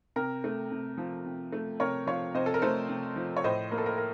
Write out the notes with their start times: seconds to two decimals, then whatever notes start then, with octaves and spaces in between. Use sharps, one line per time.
0.16 C3 A#4
0.44 A3
0.71 C3
0.98 F3
1.25 C3
1.53 A3
1.80 C3 A#4 C#5
2.07 F3 C#5 F5
2.34 C3 C5 D#5
2.46 A4
2.54 A#4
2.62 A3 A4 C5
2.89 C3
3.16 F3
3.37 C#5
3.44 A2 C5 D#5
3.71 A#3 A#4
3.78 A4
3.86 A#4
3.98 A#4